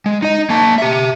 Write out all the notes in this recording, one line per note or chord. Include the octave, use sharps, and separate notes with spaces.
G#3
D#4 D#5
A#3 A5
G4 E5